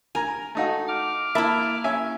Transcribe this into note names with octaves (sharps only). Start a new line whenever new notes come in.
A#4 G#5 A#5
A3 D#4 F#4
D6 F6
A#3 E4 E5 A5 B5
C#4 E5 G#5